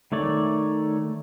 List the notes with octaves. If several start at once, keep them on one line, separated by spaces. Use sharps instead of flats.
D#3 A3 C#5 D5